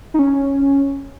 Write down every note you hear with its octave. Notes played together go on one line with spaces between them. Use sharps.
D#4
C#4